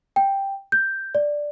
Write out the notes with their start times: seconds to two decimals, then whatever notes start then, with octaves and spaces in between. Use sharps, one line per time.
0.16 G5
0.72 G6
1.15 D5